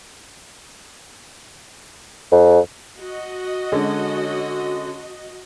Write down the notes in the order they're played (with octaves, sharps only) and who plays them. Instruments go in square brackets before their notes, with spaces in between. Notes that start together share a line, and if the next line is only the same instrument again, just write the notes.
[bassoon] F2
[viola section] F#4 D#5
[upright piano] D3 G#3 C#4